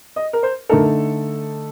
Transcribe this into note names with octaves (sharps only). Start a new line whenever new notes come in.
D#5
A#4
C5
D3 A3 D#4 A4 A#4